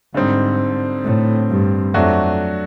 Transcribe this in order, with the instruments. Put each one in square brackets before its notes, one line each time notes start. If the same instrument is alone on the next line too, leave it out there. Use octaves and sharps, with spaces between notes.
[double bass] G#2 [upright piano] D3 G3 C4 D#4
[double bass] A2
G2
[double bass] F2 [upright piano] F#3 A3 D4 F#4